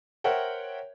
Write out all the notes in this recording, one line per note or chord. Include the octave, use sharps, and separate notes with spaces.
A#4 C5 C#5 E5 F#5 G5